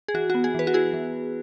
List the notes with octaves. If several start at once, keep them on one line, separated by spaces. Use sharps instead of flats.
G#4
E3 F#4
B3 F#4
G#4
E3 B4
F#4
E4 G#4
E3